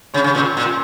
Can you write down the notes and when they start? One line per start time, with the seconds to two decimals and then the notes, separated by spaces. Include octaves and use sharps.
0.14 C#3 C#4 C#5
0.24 C#3
0.35 A#2
0.57 A#2